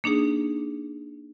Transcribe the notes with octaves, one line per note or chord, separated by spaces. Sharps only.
A#3 D4 D#4 G#4